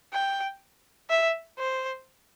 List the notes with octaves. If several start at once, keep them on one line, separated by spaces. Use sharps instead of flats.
G5
E5
C5